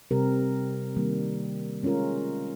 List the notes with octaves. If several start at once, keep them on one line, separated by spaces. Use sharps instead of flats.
C3 G3 C4 G4 A#4
D#3 G3 A#3
G#3 C#4 F4 A#4